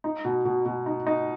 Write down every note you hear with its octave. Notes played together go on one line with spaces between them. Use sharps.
D#4
B2
B2
B2
D#4
D#4